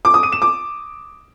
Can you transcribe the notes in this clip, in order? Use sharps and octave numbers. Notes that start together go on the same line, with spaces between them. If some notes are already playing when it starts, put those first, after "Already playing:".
D6
D#6
D#7
E7
D6